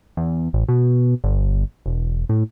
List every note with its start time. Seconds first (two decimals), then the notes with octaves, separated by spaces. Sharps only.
0.17 E2
0.53 A1
0.68 B2
1.24 G1
1.86 E1
2.29 A2